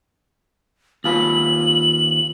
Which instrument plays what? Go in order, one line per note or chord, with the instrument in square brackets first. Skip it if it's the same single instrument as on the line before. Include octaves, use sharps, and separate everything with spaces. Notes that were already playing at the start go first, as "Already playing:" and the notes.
[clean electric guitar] D#2 F4 B4 [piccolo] F#7